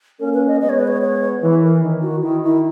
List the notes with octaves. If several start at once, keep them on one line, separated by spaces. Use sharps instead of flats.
A#3 C#4 A#4
B4
D#5
G#3 B3 D#5
C#5
B4
C#5
C#5
E3 B4
A#4
D#3
F#4
D#3 E4
E4